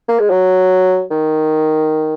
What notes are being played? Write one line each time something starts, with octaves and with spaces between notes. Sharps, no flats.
A#3
G#3
F#3
D#3